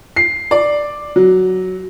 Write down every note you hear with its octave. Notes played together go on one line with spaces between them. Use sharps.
C7
D5
F#3